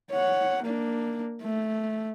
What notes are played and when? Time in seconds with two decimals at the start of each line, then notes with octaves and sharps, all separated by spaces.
0.11 C#5 F#5
0.63 A#3 D4
1.42 A3